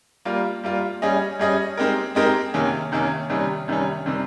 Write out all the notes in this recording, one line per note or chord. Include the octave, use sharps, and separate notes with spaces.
G3 A#3 F4
G3 A#3 F4
G3 C#4 G#4 D#5
G3 C#4 G#4 D#5
G#3 C4 D#4 G4 A#4
G#3 C4 D#4 G4 A#4
C3 D#3 A#3 C#4
C3 D#3 A#3 C#4
C3 D#3 G3 C#4
C3 D#3 G3 C#4
C3 D#3 G3 C4 G4